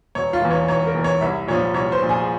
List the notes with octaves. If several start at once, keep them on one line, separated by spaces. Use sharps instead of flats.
E1 C#5
F4
E2 E3
C#5
E1 C#5
A#4
E2 E3
C#5
C2 E5
A#2 F3 C#5
C2 C#5
C5
A#2 F3
G#4